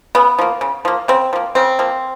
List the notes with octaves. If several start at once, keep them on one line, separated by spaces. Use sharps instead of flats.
C#3 B3
F3 A#3
C#3
F3 A#3
C#3 C4
F3 A#3
C#3 C4
F3 A#3